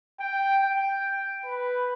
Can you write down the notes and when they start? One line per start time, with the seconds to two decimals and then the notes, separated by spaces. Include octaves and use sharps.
0.20 G5
0.62 G5
1.43 B4